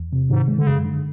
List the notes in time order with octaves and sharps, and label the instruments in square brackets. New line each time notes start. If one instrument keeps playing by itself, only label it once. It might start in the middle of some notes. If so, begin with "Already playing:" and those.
Already playing: [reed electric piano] E2
C3
[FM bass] G#2 [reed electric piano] D#3
[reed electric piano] G#3
[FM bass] D3
[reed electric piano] F#2 [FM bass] C#3
[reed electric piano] D3